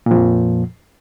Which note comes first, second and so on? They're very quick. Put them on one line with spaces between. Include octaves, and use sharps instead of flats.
A#2 F3 F2